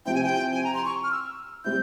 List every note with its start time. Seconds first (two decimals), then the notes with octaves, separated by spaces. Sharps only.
0.06 C3 F3 C4 E4 G5
0.15 G#5
0.24 G5
0.53 G#5
0.64 A#5
0.74 C6
0.85 C#6
1.04 F6
1.12 E6
1.64 G3 C4 E4 G6